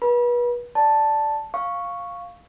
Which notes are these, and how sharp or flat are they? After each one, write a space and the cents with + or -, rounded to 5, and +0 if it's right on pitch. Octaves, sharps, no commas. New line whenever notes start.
B4 -30 B5 -35
D5 +0 A5 +0
F5 +5 C#6 +0